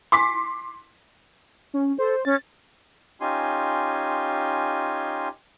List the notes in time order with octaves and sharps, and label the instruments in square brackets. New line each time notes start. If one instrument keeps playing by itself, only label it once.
[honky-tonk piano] C6 D6 B6
[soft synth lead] C#4
[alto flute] A4 [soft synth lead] C5
[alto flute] C#4 [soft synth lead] A6
[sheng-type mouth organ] C#4 D#4 F4 G4 G#5 C6